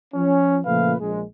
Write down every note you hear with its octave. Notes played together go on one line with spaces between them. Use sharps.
F3 C#4
A#2 C#3 F3 A3 B4 F5
A#1 G#3